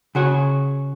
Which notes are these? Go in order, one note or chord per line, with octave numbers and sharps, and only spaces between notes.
C#3 F#4 C#5